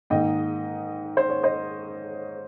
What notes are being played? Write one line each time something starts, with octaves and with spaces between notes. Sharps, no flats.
G#2 D#3 A#3 D#5 G5
C5
C#5
C5 D#5